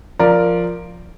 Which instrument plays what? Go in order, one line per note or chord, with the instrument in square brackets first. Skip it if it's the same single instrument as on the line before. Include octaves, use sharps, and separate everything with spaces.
[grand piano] F3 A#4 D5